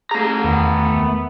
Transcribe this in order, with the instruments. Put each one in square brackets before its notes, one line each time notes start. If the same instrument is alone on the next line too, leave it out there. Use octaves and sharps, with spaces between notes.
[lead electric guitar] A3 A#5 [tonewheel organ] G#4
[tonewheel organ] E2 [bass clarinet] D#3 [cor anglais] B3